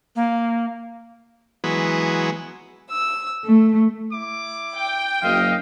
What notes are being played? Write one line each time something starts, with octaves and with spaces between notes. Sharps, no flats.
A#3
E3 F#3 G#3 B3
E6
A3
E4 D6
G5
F#1 F#2 D#5 F5